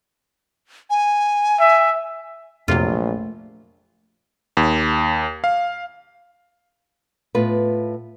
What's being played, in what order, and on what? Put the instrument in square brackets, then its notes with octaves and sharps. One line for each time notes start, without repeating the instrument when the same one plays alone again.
[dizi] G#5
[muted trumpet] E5
[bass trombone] A#1 [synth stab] F2 C3 F#3 [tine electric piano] A3 [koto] F4
[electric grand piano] D#2
F5
[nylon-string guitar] A2 B3 F4 B4